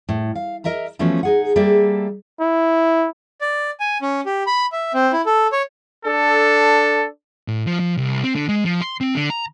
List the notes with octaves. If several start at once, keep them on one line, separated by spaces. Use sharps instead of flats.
A2
F5
A#4 D#5 E5 A#5
E3 F3 A3 B3 C#4 F#4
D#4 G#4 F#5
G3 A#3 G#4 A4 E5
E4
D5
G#5
C#4
G4
B5
E5
C4
E4
A4
C#5
D4 A4
A2
F3
F3
C2
C4
D3
G#3
F3
C6
C4
D3
A#5